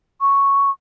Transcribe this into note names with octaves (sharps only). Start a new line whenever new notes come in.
C#6